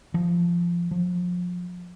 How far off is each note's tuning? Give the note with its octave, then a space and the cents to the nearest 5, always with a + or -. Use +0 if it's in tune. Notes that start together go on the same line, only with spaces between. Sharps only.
F3 -15
F3 +30